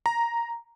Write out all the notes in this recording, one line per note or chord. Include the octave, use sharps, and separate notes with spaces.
A#5